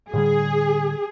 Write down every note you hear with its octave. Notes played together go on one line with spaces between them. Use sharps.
A2 D3 G3 G#4